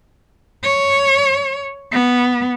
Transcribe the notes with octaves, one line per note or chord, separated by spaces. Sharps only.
C#5
B3